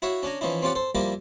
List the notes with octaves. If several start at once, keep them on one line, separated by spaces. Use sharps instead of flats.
E4 F#4 C#5 E5 F5
C#4 D4 G#5 A#5
E3 F3 C#4 D#4 E4
C4 C#4 F4 G4 D5 F#5
A4 C5
F3 G3 A#3 E4 G4 A#4